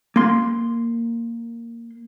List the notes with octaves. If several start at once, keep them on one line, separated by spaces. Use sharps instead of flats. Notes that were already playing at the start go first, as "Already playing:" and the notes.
A#3 C6